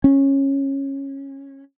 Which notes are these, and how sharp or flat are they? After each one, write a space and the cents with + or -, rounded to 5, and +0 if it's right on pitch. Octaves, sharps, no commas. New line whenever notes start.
C#4 -15